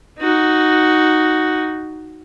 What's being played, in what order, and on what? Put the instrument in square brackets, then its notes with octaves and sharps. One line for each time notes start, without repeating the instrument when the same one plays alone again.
[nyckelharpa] D#4 F#4